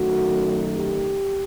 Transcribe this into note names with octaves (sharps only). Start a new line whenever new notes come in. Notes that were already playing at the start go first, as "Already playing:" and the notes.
Already playing: F#2 D#3 F#3 A3 F#4
G4